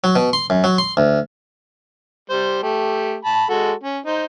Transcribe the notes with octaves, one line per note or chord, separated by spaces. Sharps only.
F#3
B2
C6
F#2
F#3
C6
D2
G3 C5
A3 G4
A5 B5
G#3 F#4 A4
C#4
D#4 C5